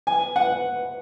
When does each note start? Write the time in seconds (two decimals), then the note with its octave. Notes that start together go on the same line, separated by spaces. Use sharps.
0.07 G#5
0.36 F#5